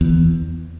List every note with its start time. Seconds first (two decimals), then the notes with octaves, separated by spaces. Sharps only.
0.01 E2